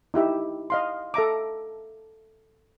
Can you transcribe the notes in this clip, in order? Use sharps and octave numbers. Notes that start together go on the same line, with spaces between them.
D#4 E4 G4 E5
D#5 F5 C6
A4 E5 A#5 D6